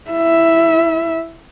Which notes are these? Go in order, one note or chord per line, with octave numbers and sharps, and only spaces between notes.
E4 E5